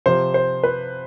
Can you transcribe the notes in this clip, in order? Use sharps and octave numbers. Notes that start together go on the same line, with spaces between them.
C3 F3 C5
C5
B4